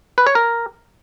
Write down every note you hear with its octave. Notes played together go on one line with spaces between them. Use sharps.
B4
C#5
A#4